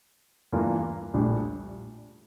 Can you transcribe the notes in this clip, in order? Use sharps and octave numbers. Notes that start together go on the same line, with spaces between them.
G2 E3 A#3 F4
A#1 A2 G3 D4